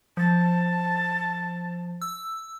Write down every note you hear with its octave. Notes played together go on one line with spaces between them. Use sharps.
F3 A5
E6